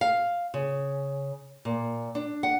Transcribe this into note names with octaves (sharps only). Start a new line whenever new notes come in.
F5
C#3
A#2
D4
F#5